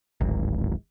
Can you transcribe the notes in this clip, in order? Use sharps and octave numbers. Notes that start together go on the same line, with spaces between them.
D1 G#1